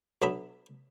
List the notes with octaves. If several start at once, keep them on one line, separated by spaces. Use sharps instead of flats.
B1 F#3 B3 D4 E5 B5